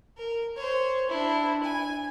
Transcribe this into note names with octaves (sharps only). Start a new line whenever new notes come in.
A#4
C5 C#5
D4 E4
G#5